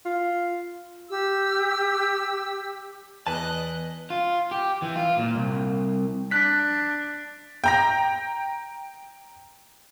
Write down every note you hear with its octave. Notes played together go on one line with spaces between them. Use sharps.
F4
G4 E6
E2 B4 D#5 G#5 A5 F#6
F4
G4
E3
F4
A#2
C2
D4 F#6 B6
G5 A#5 A#6